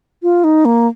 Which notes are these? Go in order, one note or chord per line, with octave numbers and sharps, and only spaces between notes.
F4
D#4
A#3